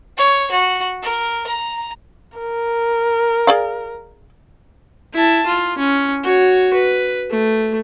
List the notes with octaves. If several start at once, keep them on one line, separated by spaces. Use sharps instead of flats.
C#5
F#4
A#4
A#5
A#4
G#4 D5 F5
E4 A5
F4
C#4
F#4 C#5
B4
A3